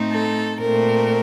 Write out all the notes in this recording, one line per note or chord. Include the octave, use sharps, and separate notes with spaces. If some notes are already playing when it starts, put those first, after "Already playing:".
Already playing: A2 A3 C4 D#4
A4
A#2 A3 C4 A#4